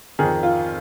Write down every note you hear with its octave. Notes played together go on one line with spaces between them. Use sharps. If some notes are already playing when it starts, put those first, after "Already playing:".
F2 D#3 G#4
F4